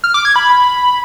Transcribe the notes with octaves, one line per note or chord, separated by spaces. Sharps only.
F6
D6
G#6
B5